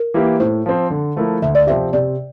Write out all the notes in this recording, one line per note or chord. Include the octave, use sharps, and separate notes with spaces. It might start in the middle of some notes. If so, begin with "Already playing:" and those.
Already playing: A#4
E3 A#3 E4 G4
A2 C5
F3 C4
D3
F3 A3 E4 A#4
D2 E5
D5
C3 F3 C4 G4 E5
C3 D5